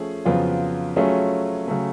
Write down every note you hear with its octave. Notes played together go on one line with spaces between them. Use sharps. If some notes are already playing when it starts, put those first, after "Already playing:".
Already playing: F3 A3 C#4 G#4
F2 C#3 F#3 B3 F4
F#3 A3 C#4 F4 G#4
C#3 F#3 A3